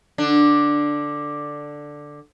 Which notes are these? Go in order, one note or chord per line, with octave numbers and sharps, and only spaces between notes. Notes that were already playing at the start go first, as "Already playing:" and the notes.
D3 D4